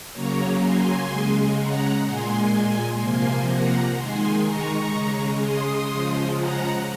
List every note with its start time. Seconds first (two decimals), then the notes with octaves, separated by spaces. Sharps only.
0.13 C#3 F#3 A#3 A#4 C#5
0.61 G#5 C6
1.09 C#3 G#3
1.57 F#5 A#5
2.05 A#2 G#3 G#5 C6
3.00 C3 F3 A#3 G#5 C6
3.49 F#5 A#5
3.96 D#3 G#3 G#5 C6
4.44 A#5 C#6
4.92 C#3 G#3
5.41 C6 D#6
5.89 C#3 F3 G#3
6.36 F#5 A#5